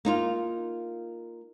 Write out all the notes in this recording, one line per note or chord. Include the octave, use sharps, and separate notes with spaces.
A#3 D#4 F4